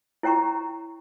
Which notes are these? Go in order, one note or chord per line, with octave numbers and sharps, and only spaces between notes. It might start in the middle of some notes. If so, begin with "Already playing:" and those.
E4 C#5 G5 A#5 C#6